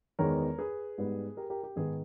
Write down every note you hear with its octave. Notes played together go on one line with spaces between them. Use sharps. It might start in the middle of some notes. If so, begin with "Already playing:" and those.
E2 D#3 G#3 B3 A#4 C#5
G#4 B4
G#2 G3 B3
G4 A#4
G4 A#4
G4
G#2 D#3 G#3 B3 G#4